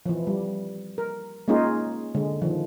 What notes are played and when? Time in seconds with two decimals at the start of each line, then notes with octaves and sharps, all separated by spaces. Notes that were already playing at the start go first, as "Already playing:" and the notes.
0.06 E3 F3
0.27 G3
0.98 A#4
1.48 G#3 A#3 C#4 D#4 F4 G#4
2.15 D3 G#3
2.42 D#3 F3